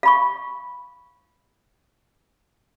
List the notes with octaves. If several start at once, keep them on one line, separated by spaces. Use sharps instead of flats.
F5 B5 C#6